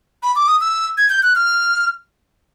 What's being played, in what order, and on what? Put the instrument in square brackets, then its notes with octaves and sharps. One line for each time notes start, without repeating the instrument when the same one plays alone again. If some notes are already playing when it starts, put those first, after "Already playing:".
[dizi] B5
D6
D#6
E6
G#6
G6
F#6
F6